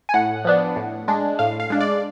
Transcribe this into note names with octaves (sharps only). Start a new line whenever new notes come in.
G#5
A2 F#5
F3 B3 D4
A2
G#3 D4
A2 F5
F5
G#3 D4
D5